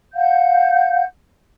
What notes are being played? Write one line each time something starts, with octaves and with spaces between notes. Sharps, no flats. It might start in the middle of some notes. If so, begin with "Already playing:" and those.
F5 F#5 G6